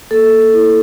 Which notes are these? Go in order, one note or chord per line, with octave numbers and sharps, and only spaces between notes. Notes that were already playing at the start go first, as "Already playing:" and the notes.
A#3 A4
E4